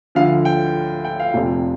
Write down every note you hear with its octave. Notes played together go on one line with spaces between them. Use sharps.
D2 D3 F3 F5
G5
G5
F5
F1 F2 C3 F3